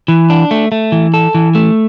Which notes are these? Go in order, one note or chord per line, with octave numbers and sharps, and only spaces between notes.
E3
D4
A3
A3
E3
A4
E3
A3